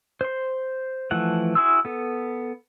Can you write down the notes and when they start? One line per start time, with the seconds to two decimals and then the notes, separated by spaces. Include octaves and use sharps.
0.21 C5 C6
1.11 E3 F3 A3 F#5
1.55 E4 F#4 G#4 C6 E6
1.85 B3 A4